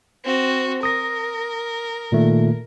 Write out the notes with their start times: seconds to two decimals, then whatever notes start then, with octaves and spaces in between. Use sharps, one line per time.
0.25 C4 F#4
0.83 A#4 D#6 A#6
2.12 A#2 D#3 A3